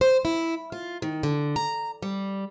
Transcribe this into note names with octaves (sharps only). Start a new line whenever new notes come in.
C5
E4
F4
D#3
D3
A#5
G3